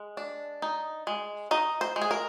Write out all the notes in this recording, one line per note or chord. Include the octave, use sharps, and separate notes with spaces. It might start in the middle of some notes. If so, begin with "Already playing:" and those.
Already playing: G#3
D4
D#4
G#3
D#4 D#5
C5
G#3
G#4
A#4